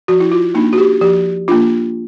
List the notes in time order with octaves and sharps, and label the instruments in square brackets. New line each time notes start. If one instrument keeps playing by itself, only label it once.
[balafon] F3 F#4
E4
F4
A#3 D4 D#4
F#4
G4
F3 G4
A#3 D4 F4